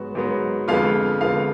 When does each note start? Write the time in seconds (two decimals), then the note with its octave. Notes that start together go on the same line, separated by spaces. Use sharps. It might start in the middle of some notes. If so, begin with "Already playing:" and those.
Already playing: G#2 F#3 B3 F#4
0.15 G#2 F#3 B3
0.68 F2 D3 G#3 B3 F4 F5
1.21 F2 D3 G#3 B3 F4 F5